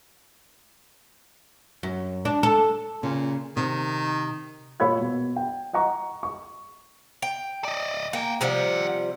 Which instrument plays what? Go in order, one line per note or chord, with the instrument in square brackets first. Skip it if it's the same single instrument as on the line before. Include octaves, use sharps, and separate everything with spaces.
[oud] F#2
D4
A4
[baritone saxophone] A#2 [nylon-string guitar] C#3
[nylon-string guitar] C3 [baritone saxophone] D#3
[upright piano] A#2 C#5 F5 B5 E6 G#6
B2
G5
D#5 F#5 A#5 C#6
C#6
[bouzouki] G5
[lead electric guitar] D5 D#5
[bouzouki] A#3 [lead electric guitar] F#5 G5
[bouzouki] C3 F3 G3 [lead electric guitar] D#3 F#5